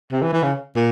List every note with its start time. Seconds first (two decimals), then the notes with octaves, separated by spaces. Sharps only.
0.12 C3
0.22 E3
0.33 E3
0.43 C#3
0.76 A#2